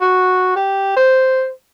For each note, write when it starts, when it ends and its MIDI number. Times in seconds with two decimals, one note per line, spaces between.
0.01 0.54 66
0.56 0.96 67
0.97 1.49 72